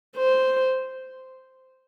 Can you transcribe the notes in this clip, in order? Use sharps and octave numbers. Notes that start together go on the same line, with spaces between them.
C5